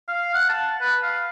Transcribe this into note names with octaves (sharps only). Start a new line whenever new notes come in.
F5
F#5
A5
B4
F5